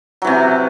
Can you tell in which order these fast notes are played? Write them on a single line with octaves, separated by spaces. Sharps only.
F#3 E3 C3